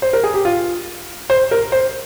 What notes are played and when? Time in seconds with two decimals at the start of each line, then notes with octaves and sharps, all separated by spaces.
0.02 C5
0.13 A#4
0.24 G#4
0.34 G4
0.45 F4
1.30 C5
1.51 A#4
1.72 C5